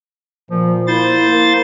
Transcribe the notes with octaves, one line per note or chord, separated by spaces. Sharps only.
A#2 F3
A#3 E4 C5 A6
A#3